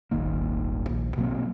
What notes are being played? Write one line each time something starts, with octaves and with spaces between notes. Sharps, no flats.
D#1 G#1 D#3 A#3
A#1
B2 F#3 A#3 C4